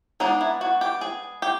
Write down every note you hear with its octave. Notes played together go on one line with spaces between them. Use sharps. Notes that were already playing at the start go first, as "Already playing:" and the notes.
G#3 B3 D4 D#4
E4
F#4
G4
G#4
G4